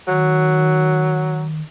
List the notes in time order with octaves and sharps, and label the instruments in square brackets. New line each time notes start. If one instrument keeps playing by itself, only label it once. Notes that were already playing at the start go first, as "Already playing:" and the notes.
[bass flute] D#3 [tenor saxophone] F#3